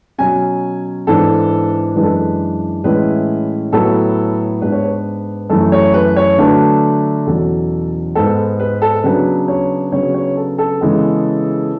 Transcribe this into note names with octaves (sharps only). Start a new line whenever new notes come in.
B2 F#3 C#4 G#5
G#2 E3 B3 D4 A4
F#2 E3 G#3 D4 B4
A4
B4
A2 E3 G#3 C#4 E4 B4
A2 F#3 B3 A4
G#2 G#3 B3 D4 B4
C#5
B4
F#2 E3 A3 A4
C#5
B4
C#5
D3 F#3 A3 D4 B4
E2 B2 F#3 C#4 A4
G#2 G#3 B3 A4
B4
A4
C#3 F#3 B3 D4 B4
C#5
C#3 F#3 B3 D4 C#5
C#5
A4
A4
C#3 E3 G#3 B3